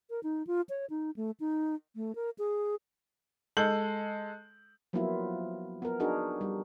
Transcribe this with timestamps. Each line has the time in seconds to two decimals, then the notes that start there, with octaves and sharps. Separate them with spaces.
0.10 A#4
0.23 D#4
0.47 F4
0.69 C#5
0.90 D#4
1.16 A3
1.40 D#4
1.96 A3
2.15 A#4
2.38 G#4
3.57 G#3 A4 G6 F#7
4.93 F3 F#3 A#3 B3 E4 F4
5.82 B3 A#4
6.00 D4 D#4 F#4 G#4 A#4
6.41 G3